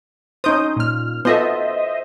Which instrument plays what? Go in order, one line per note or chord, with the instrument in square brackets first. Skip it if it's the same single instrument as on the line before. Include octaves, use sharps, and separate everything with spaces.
[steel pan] C#4 D#4 C5 [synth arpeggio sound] D#6 G6
[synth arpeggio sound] A#2 F6
[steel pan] B3 F4 A4 [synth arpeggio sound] C5 D#5 E5